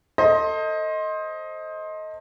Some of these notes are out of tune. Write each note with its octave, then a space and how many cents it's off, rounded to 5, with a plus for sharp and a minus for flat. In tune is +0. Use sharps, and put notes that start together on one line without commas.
A4 +30 C5 +20 D#5 +15